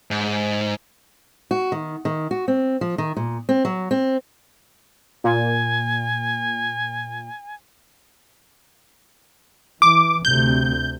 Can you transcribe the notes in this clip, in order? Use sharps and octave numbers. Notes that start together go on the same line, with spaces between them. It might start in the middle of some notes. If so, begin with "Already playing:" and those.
G#2
F#4
D#3
D#3
F#4
C4
F3
D#3
A#2
C4
F#3
C4
A#2 G#5
E3 D6
D2 C3 G6